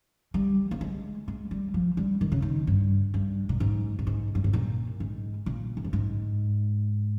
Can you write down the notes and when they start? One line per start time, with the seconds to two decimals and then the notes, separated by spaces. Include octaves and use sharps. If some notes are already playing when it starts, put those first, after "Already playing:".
0.34 G3
0.71 A#3
0.81 G#3
1.28 G#3
1.51 G3
1.74 F3
1.97 G3
2.21 D#3
2.32 C#3
2.42 D#3
2.67 G2
3.14 G2
3.49 A#2
3.60 G#2
3.99 A#2
4.07 G#2
4.35 G2
4.44 G#2
4.53 A#2
5.00 G#2
5.46 A#2
5.77 F2
5.84 G2
5.93 G#2